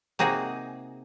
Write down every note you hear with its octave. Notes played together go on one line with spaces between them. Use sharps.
C3 A#3 D#4 F#4 G#4